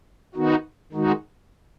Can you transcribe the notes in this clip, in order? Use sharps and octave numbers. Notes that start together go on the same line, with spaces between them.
D#3 B3 D#4 F#4
D#3 G#3 D#4 F#4